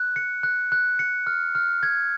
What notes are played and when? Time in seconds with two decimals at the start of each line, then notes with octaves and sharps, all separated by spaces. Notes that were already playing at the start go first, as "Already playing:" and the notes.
Already playing: F#6
0.16 C#7
0.43 F#6
0.72 F#6
0.99 C#7
1.27 F6
1.55 F6
1.83 G#6